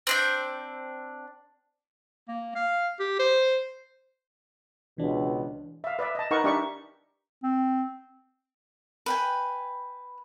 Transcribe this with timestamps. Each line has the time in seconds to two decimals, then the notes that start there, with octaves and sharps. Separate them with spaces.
0.07 C4 D4 G6
2.28 A#3
2.55 F5
3.00 G4
3.19 C5
4.98 C#2 B2 E3 D4
5.84 E5 F5
5.99 B4 D5 E5
6.15 D#5 A5
6.31 D#4 A#4 B4 D#5 F#5 C#6
6.44 D4 D#4 G4 D5 E5 C#6
7.43 C4
9.06 B4 G5 G#5